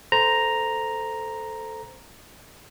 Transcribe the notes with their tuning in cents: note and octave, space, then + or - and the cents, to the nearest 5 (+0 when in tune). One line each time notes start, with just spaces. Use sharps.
A4 +0 C5 -15 A#5 +0